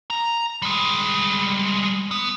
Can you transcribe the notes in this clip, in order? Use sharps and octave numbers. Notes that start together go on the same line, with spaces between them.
A#5
G3 G#3
B3